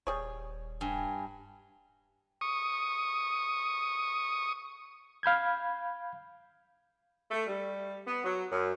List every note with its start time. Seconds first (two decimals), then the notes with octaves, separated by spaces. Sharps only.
0.07 D#1 G3 G#4 C#5
0.81 G2 G#5
2.41 C#6 D#6
5.23 F5 B5 G6 G#6
7.31 A3
7.47 G3
8.07 B3
8.25 F#3
8.52 F#2